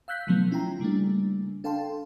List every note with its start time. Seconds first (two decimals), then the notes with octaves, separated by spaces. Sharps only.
0.08 F5 E6 F#6 G6 B6
0.27 B2 D3 F3 F#3 A3 B3
0.51 C#4 E4 F4 G5 A#5
0.80 C#3 G3 A3 A#3 D4
1.64 D4 A4 F5 G5 A5 C6